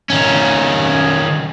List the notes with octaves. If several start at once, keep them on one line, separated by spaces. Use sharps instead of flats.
D#3 C#4